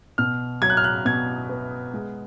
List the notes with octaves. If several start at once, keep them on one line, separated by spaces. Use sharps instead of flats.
B2 F6
F#3 G#6
F#6
F6
F#6
B2 G#6
B3
G#3